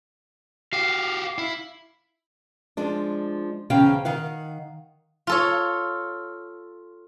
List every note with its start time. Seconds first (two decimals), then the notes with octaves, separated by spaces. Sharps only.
0.73 F#4 G4 F5
1.38 E4
2.77 F3 G#3 D4
3.70 E2 C#3 C#4 C5 F5 G5
4.05 D#3 F5 F#5
5.27 F4 A4 C#5